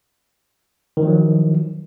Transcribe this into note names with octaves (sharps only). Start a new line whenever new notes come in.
D#3 F3 F#3